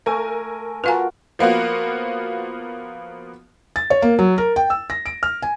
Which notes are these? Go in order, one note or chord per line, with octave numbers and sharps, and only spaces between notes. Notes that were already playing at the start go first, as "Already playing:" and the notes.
A3 A#4 G#5
F4 F#4 A#4 B4 F5 G#5
F3 A#3 B3 F4 F#4
A6
C#5
A#3
F#3
A#4
G5
E6
A#6
D7
F6
G#5